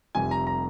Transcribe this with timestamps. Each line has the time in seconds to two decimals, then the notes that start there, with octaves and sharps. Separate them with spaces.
0.15 F1 F2 C3 G3 G#5
0.31 A#5
0.47 A#5